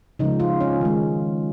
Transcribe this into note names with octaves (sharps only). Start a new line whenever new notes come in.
C#3 F3 G#3 D#4
F4
C#4
D#3 G#3